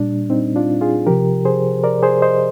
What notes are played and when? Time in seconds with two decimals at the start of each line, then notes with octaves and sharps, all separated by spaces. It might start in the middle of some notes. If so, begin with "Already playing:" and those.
Already playing: A#2 G3 D4
0.30 C4 D#4
0.56 D4 F4
0.81 F4 G#4
1.06 C3 F3 G4 A#4
1.45 G#4 C5
1.83 A#4 D5
2.03 G#4 C5
2.22 C5 D#5